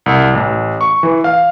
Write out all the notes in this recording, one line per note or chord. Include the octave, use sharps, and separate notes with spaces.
C2
A1
C#6
E3
F5